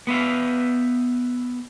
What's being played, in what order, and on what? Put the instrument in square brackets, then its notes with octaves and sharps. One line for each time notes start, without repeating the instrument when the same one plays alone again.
[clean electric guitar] B3 B4 E5 F5